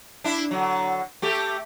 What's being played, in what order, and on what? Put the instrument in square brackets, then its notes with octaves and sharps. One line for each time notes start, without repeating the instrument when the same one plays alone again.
[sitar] D4 E4
D3 F#3
A3 G4 A4